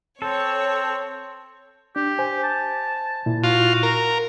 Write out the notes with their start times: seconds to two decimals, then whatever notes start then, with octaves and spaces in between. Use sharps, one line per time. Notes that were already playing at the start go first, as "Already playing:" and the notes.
0.22 C4 A4 C#5
1.96 D4 G4
2.19 C5 G#5
2.43 A5
3.26 A#2 E4
3.44 F4 F#4
3.83 A#4